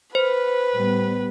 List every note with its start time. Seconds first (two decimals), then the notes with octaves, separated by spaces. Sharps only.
0.15 B4 C5
0.72 A2 G3 B3